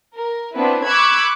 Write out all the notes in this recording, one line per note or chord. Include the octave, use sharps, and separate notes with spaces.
A#4
B3 C4 D4 E4 B4
B5 C#6 D6 E6 F#6 G#6